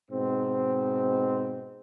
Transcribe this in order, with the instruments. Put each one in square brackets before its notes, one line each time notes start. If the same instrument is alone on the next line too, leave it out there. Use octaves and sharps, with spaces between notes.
[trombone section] G#2 B2 C4